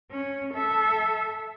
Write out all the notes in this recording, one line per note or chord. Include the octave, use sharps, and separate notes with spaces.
C#4
A4 E5